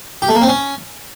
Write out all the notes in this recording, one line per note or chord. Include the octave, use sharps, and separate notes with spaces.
G4
A3
A#3
C4
C#4